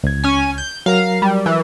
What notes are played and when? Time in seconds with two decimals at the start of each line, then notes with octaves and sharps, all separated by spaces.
0.04 C#2 G#6
0.24 C#4 G#5
0.58 G6
0.86 F#3 A#4 F5 A#5
1.22 G3
1.46 E3